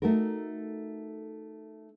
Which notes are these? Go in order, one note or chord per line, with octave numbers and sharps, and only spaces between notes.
A3 D#4 F#4 A4 A#4